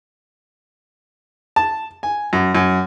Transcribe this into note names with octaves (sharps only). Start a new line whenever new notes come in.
A5
G#5
F#2
F#2